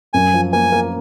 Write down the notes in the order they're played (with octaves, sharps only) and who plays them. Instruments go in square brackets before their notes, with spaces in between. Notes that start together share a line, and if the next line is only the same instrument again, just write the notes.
[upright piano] F#2 [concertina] G#5
[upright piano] F3
[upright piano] A#3 [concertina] G#5
[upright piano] A#3